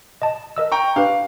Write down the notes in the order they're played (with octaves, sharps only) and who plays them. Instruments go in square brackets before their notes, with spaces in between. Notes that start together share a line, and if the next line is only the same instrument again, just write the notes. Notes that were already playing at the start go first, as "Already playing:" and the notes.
[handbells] D#5 A5
A#4 D#5 E6
[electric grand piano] G5 A#5 C#6
[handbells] D4 G4 B4 [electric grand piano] F5